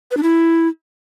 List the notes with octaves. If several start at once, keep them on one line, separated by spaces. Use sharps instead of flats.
B4
D4
E4